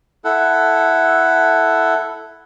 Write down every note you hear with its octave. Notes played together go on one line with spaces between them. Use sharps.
E4 A4 F#5